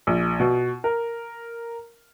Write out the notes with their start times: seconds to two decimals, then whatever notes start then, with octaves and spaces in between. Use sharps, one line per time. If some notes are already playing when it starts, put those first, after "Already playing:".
0.07 A#1
0.40 B2
0.84 A#4